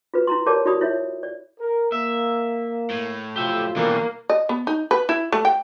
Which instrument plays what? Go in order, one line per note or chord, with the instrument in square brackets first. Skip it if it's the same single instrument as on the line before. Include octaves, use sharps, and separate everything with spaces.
[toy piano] F4 F#4 B4
E4 A#5 C6
G4 A#4 C#5 D5 A5 D6
E4 F#4 G4 D5 B5 D#6
E4 F4 C#5 E5
D5
[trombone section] A#4
[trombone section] A#3 [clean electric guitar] E5
[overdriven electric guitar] A2
[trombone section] F2 F#3 F4 [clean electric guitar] G4 E5
[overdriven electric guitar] B2 [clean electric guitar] E3 G3 D4 [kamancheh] A#3
[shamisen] D#5
B3
D#4
B4
E4
A3
G5